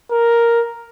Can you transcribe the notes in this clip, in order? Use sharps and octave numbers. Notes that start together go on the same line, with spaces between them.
A#4